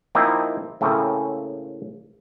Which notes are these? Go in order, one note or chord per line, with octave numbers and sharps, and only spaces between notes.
F3 A#3 C4 D#4 E4
A2 C#3 A3 A#3 C4 C#4